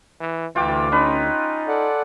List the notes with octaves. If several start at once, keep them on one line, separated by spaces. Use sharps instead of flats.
E3
D2 E3 F4 G5 D6
C#4 D#4 B4
A4 D5 F#5